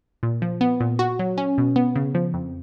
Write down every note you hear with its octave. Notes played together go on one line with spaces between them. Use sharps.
A#2
F3
B3
A#2
F#4
F#3
C#4
B2
B3
C#3
F3
F2